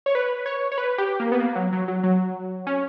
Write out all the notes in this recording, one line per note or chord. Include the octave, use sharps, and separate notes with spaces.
C#5
B4
C#5
C#5
B4
G4
A#3
B3
A#3
F#3
F#3
F#3
F#3
C#4